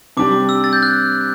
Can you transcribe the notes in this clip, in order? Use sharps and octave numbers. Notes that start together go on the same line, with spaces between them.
C3 G3 D4 G4 D6
E6
A6
G6
F#6